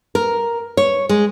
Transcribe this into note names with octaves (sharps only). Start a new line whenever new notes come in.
A#4
C#5
G#3